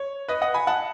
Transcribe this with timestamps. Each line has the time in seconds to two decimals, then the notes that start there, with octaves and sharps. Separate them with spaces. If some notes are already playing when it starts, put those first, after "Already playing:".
Already playing: C#5
0.28 B4 D#5
0.42 D#5 F#5
0.54 G#5 B5
0.67 F#5 A5